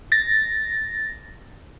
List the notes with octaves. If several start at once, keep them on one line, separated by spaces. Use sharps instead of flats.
A6 A#6